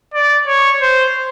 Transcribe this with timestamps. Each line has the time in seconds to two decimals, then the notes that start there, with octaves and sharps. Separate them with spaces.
0.14 D5
0.47 C#5
0.82 C5